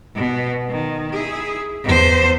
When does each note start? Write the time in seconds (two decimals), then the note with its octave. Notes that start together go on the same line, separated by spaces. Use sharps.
0.15 B2 B3
0.69 D#3
1.13 E4 G#4
1.85 E2 C5